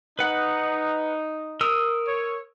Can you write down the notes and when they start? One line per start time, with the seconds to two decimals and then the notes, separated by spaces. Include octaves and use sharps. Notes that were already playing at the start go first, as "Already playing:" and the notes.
0.19 D#4 B4 F#5
1.61 A#4 D#6 E6
2.08 C#5